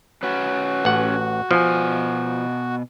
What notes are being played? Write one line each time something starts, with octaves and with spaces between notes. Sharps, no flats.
C#4 F#4 B4
A1 F#5
B2 F3 A#4 G#5